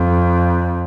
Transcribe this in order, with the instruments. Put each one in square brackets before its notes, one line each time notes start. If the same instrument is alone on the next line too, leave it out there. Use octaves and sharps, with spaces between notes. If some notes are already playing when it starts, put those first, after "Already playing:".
Already playing: [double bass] F2